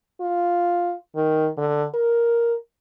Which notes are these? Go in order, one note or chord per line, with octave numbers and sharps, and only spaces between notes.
F4
D#3
D3
A#4